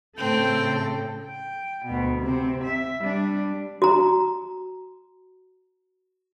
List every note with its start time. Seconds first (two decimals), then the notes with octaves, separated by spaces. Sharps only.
0.18 A2 C#3 C4 A4 G5
1.25 G5
1.86 D2 B2
2.20 C3 C4
2.63 E5
2.99 G3 D4
3.82 F#4 A#5